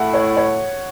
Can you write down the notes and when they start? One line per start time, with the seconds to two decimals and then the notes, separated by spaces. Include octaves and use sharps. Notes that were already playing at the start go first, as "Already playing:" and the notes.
Already playing: A2 A3 E4 F#5
0.14 C#5
0.37 C#5